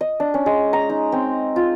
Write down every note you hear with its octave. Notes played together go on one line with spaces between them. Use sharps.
D#5
D4
C#4
G#3
A#5
D#4
C4
F4